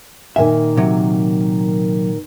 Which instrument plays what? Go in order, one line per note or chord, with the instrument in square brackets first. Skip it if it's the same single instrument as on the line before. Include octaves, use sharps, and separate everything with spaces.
[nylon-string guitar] A#2 D#3 G#5 [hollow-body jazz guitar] E5
[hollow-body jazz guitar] C3 F#3